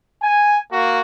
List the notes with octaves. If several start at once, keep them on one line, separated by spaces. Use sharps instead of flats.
G#5
A#3 F#4